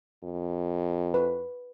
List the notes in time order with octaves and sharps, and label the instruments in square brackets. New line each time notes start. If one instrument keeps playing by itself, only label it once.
[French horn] F2
[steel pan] B4